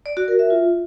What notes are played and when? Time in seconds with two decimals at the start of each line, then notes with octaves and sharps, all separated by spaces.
0.06 D5
0.17 F#4
0.28 A#4
0.39 E5
0.50 F4